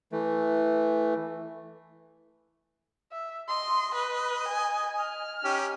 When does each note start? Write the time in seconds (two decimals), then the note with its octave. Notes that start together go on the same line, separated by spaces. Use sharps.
0.12 E3 A3
3.12 E5
3.48 D#5 C6
3.95 B4
4.49 G#5
5.00 F6
5.44 C#4 D#4 G4